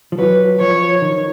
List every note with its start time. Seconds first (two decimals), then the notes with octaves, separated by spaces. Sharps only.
0.12 F3
0.18 F#3 B4
0.60 F3 C#5
1.02 D#3